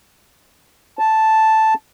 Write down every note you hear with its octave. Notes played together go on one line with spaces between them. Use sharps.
A5